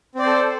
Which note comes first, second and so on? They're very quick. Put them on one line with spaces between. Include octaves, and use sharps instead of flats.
C4 D5 C5 A4